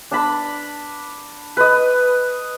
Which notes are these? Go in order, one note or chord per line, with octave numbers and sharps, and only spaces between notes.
D4 A5 B5
B4 D#5